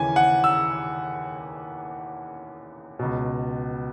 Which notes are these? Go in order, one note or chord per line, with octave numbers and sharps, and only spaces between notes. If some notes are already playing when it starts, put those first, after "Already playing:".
Already playing: D#2 C#3 E3 G#5
F#5
E6
C#2 B2